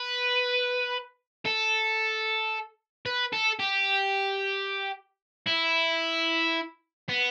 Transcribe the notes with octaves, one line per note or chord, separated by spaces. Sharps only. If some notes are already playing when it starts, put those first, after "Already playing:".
Already playing: B4
A4
B4
A4
G4
E4
B3